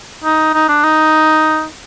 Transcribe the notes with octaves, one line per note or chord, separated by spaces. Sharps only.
D#4
D#4
D4
D#4